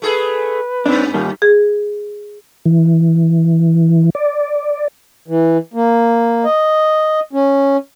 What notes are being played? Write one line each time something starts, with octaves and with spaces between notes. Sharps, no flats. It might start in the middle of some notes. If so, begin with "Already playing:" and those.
A3 G#4 A4 B4
G2 C4 D4
D#3 G3 A#3
G#4
E3
D5
E3
A#3
D#5
C#4